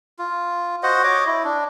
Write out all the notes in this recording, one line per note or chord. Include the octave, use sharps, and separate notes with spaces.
F4
F#4 C5 D#5 F#5
C#5 D#5 D6
E4
D4